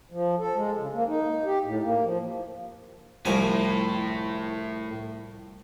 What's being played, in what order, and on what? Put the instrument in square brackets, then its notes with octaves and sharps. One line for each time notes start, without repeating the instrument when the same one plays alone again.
[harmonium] F3
A4
G#3
C#3
A#3
D#4
G4
A2
A#3
F3
[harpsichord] C2 F3 G#5 [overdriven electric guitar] A2